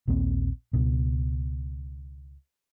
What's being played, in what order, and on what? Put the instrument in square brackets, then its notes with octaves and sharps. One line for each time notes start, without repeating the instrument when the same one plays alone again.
[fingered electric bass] A#1 D#2 A#3 C4
C#2 B2